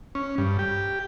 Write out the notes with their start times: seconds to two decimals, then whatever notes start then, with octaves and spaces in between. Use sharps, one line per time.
0.15 C#4
0.38 G2
0.59 G4